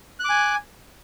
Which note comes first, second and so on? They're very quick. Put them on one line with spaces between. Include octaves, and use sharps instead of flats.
F#6 D6 G#5